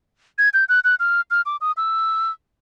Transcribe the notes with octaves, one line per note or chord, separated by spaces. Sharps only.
G#6
G6
F#6
F#6
F6
F6
D6
D#6
E6